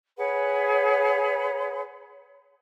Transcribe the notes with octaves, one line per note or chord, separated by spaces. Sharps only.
G#4 B4 C#5 F#5